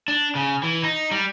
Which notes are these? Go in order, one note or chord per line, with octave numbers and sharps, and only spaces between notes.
D4
C#3
E3
D#4
G3